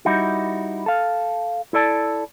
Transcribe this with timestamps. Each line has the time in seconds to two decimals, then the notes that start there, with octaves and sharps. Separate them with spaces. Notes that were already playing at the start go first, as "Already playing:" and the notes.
0.05 G3 D#4 E4 F#4
0.86 A4 F5
1.73 E4 A4 D5 A5